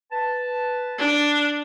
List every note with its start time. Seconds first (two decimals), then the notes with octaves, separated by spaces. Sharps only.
0.11 B4 A5
0.98 D4